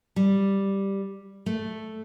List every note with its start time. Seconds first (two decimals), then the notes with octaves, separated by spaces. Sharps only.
0.16 G3
1.46 A3